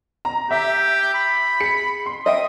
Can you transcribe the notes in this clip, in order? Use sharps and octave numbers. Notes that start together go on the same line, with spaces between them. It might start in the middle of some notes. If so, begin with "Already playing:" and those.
A#5
G4 E5
B5
G#4 C#7
C6
D#5 E5 G5 D#6